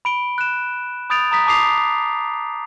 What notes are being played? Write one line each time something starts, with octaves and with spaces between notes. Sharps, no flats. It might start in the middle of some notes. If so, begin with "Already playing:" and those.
B5 D7 G7
F#6 E7
B5 D#6 G6 A6 D7 F7
A#5 D#6 B6
A5 D6 D#6 C7 F7